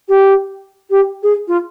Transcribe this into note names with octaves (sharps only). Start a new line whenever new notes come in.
G4
G4
G#4
F4